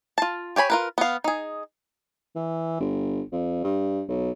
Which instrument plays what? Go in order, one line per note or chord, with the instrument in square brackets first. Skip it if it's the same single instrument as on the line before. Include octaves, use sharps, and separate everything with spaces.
[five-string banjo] F4 A5
G4 C#5 G#5 B5
F4 A#4 B4
B3 F5
D#4 G#4
[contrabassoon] E3
G1
F2
G2
B1